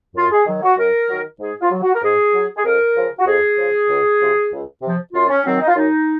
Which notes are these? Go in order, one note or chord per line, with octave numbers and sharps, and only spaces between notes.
F#2 F4
G#4
D#3 F#3
F#4
F#2 A#4
D#3 F#3
G#2 G#4
F4
F#3
F#4
A#4
G#2 G#4
F#3
G#4
F2 A#4
C#3 F3
F#4
F2 G#4
C#3 F3
C#2
C3 F3
C#2
C3 F3
F#2 F4
C#4
D#3 F#3 C4
D#4
F4
F#2 D#4